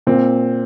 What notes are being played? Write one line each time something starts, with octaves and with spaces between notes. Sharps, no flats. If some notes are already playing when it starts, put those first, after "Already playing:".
A#2 C4